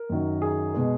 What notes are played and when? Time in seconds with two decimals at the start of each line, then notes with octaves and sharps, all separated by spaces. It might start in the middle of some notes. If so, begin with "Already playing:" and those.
Already playing: A#4
0.10 F#2 D#3 F#3
0.42 G#4
0.74 B2 G#3